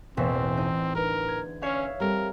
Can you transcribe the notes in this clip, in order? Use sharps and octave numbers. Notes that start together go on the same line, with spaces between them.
E1 A1 E3 A#3 C4 E5
D#4
D2 A#4 B4
G#6
C#4 C#5 E5 F5
G3 C4 A4 A#4